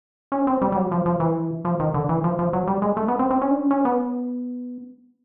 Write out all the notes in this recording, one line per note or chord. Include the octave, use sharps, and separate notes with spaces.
C#4
C4
G3
G3
F#3
F3
F3
E3
F3
D#3
D3
E3
F3
F3
F#3
G3
G#3
A3
B3
C4
C4
C#4
D4
C#4
C#4
B3